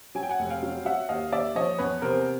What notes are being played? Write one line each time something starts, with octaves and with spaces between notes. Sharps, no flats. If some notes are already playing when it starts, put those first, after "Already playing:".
F#3 G#5
G5
F#5 G#5
F1
F5 G5
F#3
F#3 E5 F#5
D#2 D#5 F5
D#2 D5 E5
F3 C#5 D#5
E2 B4 C#5
C3 A#4 C5